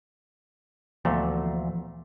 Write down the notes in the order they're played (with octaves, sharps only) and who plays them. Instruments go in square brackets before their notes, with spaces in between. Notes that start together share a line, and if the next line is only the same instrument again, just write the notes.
[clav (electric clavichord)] D2 A#2 A3 [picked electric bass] E3 F3 B3